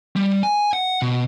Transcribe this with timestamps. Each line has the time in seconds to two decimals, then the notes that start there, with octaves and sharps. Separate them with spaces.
0.16 G3
0.43 G#5
0.73 F#5
1.02 B2